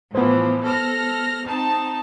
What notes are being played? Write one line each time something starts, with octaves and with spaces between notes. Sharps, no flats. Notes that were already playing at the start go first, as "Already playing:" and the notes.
A2 E3 F3 B3 C5
A4 F6 A#6
C4 D#4 A5